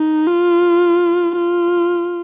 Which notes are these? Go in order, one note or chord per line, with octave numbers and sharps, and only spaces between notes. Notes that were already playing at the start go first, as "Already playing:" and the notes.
Already playing: D#4
F4
F4